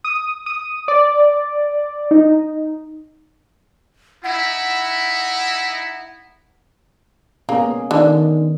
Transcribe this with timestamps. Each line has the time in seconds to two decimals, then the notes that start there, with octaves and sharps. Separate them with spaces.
0.04 D#6
0.46 D#6
0.88 D5
2.11 D#4
4.24 D#4 E4 F#5
7.49 A#3 B3 C#4 G#4
7.91 D3 D#3